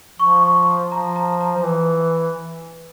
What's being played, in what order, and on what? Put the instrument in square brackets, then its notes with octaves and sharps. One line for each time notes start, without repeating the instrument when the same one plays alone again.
[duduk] F3 [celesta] C#6
[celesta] C#6
C6
[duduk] F3 [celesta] A#5
[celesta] A#5
A#5
[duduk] F3
E3